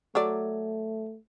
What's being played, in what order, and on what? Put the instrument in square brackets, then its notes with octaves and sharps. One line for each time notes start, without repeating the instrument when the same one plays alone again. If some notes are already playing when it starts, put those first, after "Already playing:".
[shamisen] F#3 A4 D5 [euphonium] A3